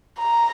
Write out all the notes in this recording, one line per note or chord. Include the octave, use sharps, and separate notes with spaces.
A#5